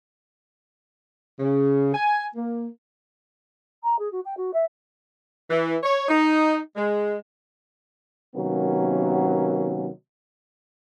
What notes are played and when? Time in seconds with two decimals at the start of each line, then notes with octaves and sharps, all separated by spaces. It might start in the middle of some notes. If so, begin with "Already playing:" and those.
1.40 C#3
1.94 G#5
2.35 A#3
3.83 A#5
3.98 G#4
4.12 F#4
4.25 G5
4.37 F#4
4.53 E5
5.50 E3
5.83 C#5
6.09 D#4
6.76 G#3
8.35 C3 D#3 F#3 A#3 B3 C#4